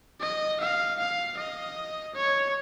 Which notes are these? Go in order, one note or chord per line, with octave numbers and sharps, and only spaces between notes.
D#5
F5
F5
D#5
C#5